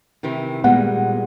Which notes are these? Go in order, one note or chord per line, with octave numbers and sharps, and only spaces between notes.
C3 D#3 E3
A#2 G3 G#3 B3 F#5